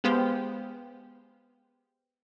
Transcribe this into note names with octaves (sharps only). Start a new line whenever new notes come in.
G#3 B3 G4 C5 F5 G5